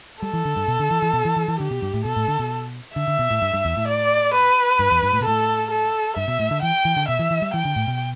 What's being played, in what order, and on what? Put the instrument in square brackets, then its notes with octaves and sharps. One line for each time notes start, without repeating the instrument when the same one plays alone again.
[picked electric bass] G3 [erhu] A4
[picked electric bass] E3
D3
G2
B2
D3
E3
E3
B2
E3
E3
E3
[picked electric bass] D3 [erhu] G4
[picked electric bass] B2
G2
A2
[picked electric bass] B2 [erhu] A4
[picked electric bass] A2
D3
B2
[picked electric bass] D3 [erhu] E5
[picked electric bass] D3
B2
A2
G2
G2
E2
A2
[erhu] D5
B4
[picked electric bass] G2
E2
G2
A2
B2
[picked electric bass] A2 [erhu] A4
[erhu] A4
[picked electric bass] G2 [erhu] E5
[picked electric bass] B2
A2
D3
[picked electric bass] E3 [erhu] G5
[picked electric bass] E3
D3
[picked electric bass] B2 [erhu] E5
[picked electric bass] E3
E3
G3
[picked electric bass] E3 [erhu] G5
[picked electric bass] D3
A2
B2